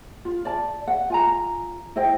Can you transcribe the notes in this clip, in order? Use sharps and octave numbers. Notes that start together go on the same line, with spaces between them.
F4
D5 A5
F#5
F4 G#5 A#5
E4 C5 D#5 G5